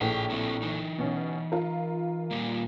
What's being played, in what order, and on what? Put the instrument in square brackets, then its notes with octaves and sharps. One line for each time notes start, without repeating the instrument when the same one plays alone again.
[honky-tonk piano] A#1 A2 [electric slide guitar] G#4 G5
[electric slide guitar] A3 C4 E4
E3 D#4
[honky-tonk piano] B2 C#4
F4 A#4
[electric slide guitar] A#2 G3 A#3